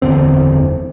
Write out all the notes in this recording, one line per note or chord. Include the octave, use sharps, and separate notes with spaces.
F#1 E2 D3 C4